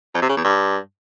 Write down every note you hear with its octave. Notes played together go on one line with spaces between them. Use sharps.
F2
C3
C#3
E2
G2